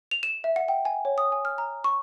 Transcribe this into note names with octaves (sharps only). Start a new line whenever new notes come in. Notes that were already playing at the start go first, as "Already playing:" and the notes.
F7
E7
E5
F#5
G5
G#5
C#5
D#6
G#5
F6
A#5
C#6